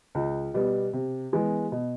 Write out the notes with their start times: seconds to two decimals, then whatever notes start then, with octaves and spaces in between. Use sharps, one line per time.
0.15 C#2
0.54 B2 G3 B3
0.93 C3
1.32 E3 G#3 B3
1.72 B2